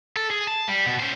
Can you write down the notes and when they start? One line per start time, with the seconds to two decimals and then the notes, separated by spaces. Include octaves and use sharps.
0.16 A4
0.30 G#4
0.47 A5
0.68 G3
0.86 B2
1.00 C#4 C5